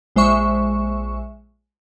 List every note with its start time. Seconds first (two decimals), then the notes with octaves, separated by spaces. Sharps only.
0.16 A#1 G#3 C5 E5 C#6